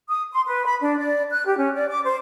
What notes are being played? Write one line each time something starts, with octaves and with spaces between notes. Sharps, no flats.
D#6
C6
B4
B5
D4
D5
F#6
G4
C#4
D5
D6
C5